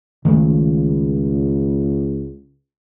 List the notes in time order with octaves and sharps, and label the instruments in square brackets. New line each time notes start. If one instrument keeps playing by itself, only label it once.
[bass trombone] C#2 [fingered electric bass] D#3 A3